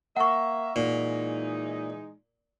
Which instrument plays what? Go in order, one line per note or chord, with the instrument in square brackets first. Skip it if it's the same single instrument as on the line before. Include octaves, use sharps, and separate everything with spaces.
[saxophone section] A#3 E5 [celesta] F#5 C#6
[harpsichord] A#2 [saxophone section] E3 G#3 D#4